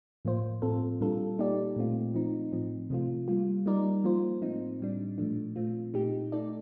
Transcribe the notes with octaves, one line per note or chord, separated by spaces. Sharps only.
A2 F3 A#3 F4 C5
A2 F3 C4 F4 A4
A#2 G3 D4 F4 A4
A#3 D#4 G4 D5
A#2 A3 C4 F4
F3 C4 D#4
A2 F3 C4
C3 F3 A3 C4 F4
G3 A#3 F4
G3 A#3 D#4 A#4 D5
F3 A#3 F4 C5
A2 F3 C4 D#4
A2 G3 D4
A#2 F3 A3 D4
A#2 A3 C4 F4
A#2 A3 D#4 G4
A3 D#4 A4 D5